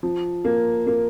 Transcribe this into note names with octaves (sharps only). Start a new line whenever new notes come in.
F3
A#3
A#3